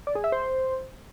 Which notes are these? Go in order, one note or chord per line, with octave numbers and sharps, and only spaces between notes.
D5
G#4
E5
C5